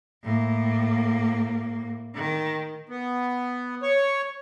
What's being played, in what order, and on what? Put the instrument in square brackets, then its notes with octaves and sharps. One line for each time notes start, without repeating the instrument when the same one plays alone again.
[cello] A2 A#3
D#3
[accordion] B3
C#5